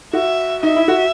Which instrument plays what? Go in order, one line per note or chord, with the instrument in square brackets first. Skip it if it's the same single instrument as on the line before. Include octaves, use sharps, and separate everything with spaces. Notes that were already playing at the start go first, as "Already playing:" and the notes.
[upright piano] F#4 [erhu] E5
[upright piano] D#4 [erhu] E5
[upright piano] E4
F#4